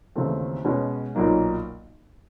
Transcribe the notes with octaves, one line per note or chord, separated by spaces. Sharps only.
D#2 C#3 E3 A3 C4
B2 G#3 C#4
B1 A#2 F#3 A#3 D#4